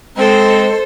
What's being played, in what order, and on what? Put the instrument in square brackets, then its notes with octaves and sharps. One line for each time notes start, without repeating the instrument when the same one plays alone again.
[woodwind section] G#3 C4 [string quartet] A4 C5